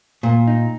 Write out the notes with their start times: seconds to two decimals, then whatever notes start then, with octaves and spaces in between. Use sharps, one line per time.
0.23 A#2
0.47 D#4